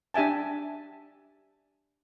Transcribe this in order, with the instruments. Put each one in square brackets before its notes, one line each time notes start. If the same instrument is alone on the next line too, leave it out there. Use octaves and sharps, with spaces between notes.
[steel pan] D4 G4 E5 G#5 A5